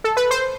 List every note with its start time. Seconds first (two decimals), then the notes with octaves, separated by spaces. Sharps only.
0.04 A4
0.17 B4
0.31 C5